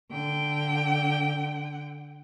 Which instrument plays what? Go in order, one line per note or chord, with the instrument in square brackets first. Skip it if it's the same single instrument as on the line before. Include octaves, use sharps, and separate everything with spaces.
[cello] D3 G5